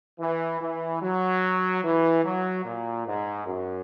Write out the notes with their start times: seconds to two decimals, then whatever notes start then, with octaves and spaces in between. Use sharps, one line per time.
0.19 E3
0.60 E3
1.01 F#3
1.83 E3
2.23 F#3
2.64 A#2
3.05 G#2
3.46 F#2